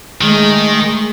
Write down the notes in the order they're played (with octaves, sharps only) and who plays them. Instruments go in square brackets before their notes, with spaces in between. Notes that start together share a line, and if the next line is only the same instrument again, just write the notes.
[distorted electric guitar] D#3 [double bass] G#3 A3